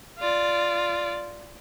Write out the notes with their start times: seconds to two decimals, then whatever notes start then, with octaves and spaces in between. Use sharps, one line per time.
0.19 F4 D5